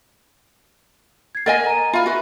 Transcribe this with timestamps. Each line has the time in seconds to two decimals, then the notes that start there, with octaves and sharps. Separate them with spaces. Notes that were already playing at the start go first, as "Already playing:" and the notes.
1.35 G#6 C7
1.46 A#4 D#5 F#5 G#5 A6
1.66 A#5 D#7
1.93 F4 E5 G#5 B5
2.06 F#4 B4